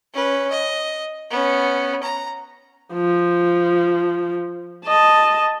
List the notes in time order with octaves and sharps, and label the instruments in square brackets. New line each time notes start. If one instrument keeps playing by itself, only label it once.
[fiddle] C#4 B4
D#5
B3 C#4
A#5
[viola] F3
D#5 A5